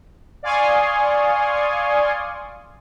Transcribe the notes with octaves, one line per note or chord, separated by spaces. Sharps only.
D5 F5 G#5 C6 C#6 D#6